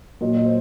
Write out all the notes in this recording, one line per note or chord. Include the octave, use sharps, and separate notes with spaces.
A#2 F#3 D#5
D#5
C5